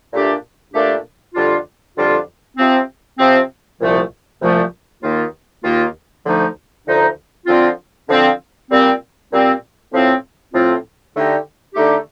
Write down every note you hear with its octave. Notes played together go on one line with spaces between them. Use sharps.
A#2 A3 D4 G4
A#2 A3 D4 G4
F2 D3 G3 D4 F4
F2 D3 G3 D4 F4
C3 F3 C4
C3 F3 C4
C2 A#2 F3 A3
C2 A#2 F3 A3
D#2 D#3 A#3 F4
D#2 D#3 A#3 F4
D2 D3 F3 A3 D#4
D2 D3 F3 A3 D#4
D3 F3 C4 F4
D3 F3 C4 F4
A#2 G3 C4
A#2 G3 C4
A2 F3 C4 F4
A2 F3 C4 F4
D3 A3 D#4 G4
D3 A3 D#4 G4